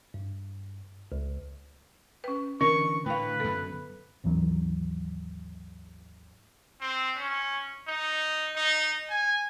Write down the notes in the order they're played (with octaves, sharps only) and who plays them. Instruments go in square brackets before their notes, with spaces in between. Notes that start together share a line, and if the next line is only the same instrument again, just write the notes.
[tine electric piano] G2
C#2
[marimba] C#4 B4
[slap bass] D3 E3 C#4 [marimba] A#4 [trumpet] C#6
[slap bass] A2 D3 [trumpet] B4 [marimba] F5 G5
[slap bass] F#2 D3 [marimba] B3 A4
[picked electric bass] G#1 D#2 E3 F#3
[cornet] C4
C#4
D#4
D#4
G#5